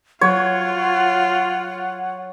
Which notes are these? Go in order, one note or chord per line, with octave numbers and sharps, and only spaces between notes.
F#3 F4 C#5 F#5